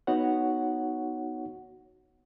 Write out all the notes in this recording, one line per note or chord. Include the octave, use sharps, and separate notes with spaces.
B3 D#4 F#4 C#5 F#5